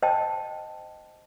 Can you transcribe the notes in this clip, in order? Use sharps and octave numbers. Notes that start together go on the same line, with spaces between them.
C5 D#5 G5 A5